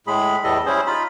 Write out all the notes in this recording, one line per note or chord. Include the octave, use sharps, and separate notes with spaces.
A2 G#3 G#4 B5
E2 A2 G3 A4 D#5
G3 C#4 E4 G#4 C5
D#4 F4 B5